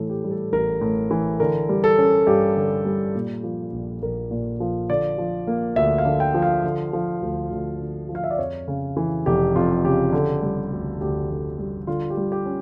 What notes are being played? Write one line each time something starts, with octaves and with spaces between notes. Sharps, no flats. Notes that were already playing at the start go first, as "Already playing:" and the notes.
Already playing: A2 E3 A4
G4
G3
A4
A1 A#4
A2
E3
D3 A#4
G3
A4
C#4
G2 G4
D3
G3
A#2
F3
A#1
A#1 A#4
A#2
F3
D3 D5
F3
A#3
D2 E5
F5
D3
G5
F3
F5
D3
F3
D2
D2
D3
F3
F5
E5
D5
F2 C#5
C#3
E3
F1 G4
F2 F4
C#3 G4
D3
G3
D2
D2 G4
D3
G3
D3 F4
G4
G3
G4
C#4